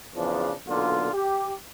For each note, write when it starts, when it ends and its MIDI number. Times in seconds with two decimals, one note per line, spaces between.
0.15 0.53 40
0.15 0.53 49
0.15 0.53 53
0.15 0.53 62
0.68 1.13 35
0.68 1.13 46
0.68 1.13 50
0.68 1.13 65
1.13 1.51 67